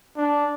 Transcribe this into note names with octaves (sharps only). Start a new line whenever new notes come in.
D4